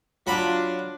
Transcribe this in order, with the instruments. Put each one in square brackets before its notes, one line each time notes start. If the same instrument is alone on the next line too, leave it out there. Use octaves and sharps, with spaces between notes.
[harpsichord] F#3 B5 [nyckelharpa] D4 [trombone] F4